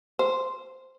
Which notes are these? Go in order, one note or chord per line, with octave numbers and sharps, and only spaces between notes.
C5